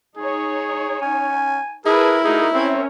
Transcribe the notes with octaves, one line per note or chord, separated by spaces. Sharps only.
D#4 G#4 C#5
C#4 G#5
E4 G#4 A#4 B4 A5
A3 D#4 F#4 G#4 A#4
C4 C#4 A#4 C#5 E5